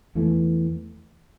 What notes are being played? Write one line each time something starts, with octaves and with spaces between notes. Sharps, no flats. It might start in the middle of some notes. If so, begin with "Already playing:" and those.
E2 E3 A3